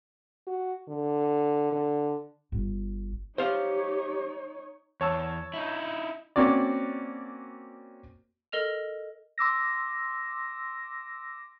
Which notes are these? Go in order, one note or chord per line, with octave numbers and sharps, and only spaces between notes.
F#4
D3
D3
G1
D#4 G4 C5 C#5 F5
E2 C#5 A5 E6
D#4 E4
A#3 C4 C#4 F#4 D5
A4 A#4 D#5 F6 F7
C6 D6 E6 A#6